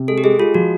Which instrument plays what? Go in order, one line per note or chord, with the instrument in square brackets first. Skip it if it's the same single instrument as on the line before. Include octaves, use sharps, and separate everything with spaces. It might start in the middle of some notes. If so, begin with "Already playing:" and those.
Already playing: [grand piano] C3
[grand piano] G#3 [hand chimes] A4
[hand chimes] G4
[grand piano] G#3 [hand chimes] G#4
[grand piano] G#3 [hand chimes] F4
[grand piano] F3 [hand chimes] F#4